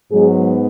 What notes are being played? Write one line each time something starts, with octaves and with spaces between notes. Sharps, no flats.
G#2 F#3 G#3 B3 G#4